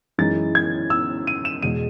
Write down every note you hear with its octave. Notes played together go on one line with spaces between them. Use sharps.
F#2 E3 G#3 D#4 A6
G#6
E6
D#7
E7
E2 B2 G#3 D#7